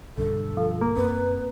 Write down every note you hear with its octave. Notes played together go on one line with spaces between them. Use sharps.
B1 G2 D3 A4
F3
A#3
F#2 C4 B4